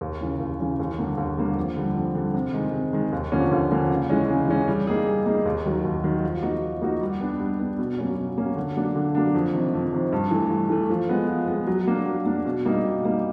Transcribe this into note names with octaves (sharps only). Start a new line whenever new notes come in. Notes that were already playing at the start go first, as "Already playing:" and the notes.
D#2
C#3 E3
D#2
C#3 E3
D#2
D3 G3 A#3
D#2
D3 G3 A#3
F2
D3 G3
F2
D3 G3
C3
D#3 G#3
C3
D#3 G#3
D#2
D3 F3 A#3 C#4
D#2
D3 F3 A#3 C#4
C#3
E3 G#3 C#4
C#3
E3 G#3 C#4
G3
A#3 D#4 G#4
G3
A#3 D#4 G#4
D#2
D#3 F#3
D#2
D#3 F#3
F3
A#3 D#4 F#4
F3
A#3 D#4 F#4
G3
B3 D4
G3
B3 D4
B2
F#3 A#3 C#4
B2
F#3 A#3 C#4
D3
F#3 A#3 D4
D3
F#3 A#3 D4
F2
C3 D#3
F2
C3 D#3
G2
E3 A3
G2
E3 A3
F3
G#3 B3
F3
G#3 B3
F#3
A#3 D4
F#3
A#3 D4
B2
G3 A#3 D#4
B2
G3 A#3 D#4